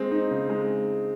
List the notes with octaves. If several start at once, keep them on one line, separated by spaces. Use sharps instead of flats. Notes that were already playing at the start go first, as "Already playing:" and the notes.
Already playing: G#3 C4
D#4
C#3
G#3